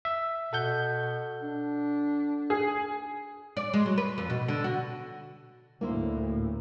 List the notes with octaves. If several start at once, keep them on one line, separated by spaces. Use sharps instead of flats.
E5
B2 A4 F#5 G6
D4
G#4
D5
G#3
F#3
B4
F2
B2
D3
F#4
D2 A2 A#3 E4 C5